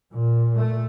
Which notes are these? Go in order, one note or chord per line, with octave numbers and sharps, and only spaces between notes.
A#2
A3